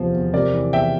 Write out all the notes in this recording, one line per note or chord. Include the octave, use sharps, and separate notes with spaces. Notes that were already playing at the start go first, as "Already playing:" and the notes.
Already playing: E2 C3 F3
E2
C3 A#4 D5
E3
E2 E5 G5